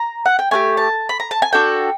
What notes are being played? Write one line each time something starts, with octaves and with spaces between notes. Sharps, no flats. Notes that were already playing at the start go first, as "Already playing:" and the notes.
Already playing: A#5
F#5
G5
A3 D4 G4 G#5
A5
B5
A#5
A5
G#5
D4 F#4 A4 G5